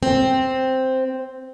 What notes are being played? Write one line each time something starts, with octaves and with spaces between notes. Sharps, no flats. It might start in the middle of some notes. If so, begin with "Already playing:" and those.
C4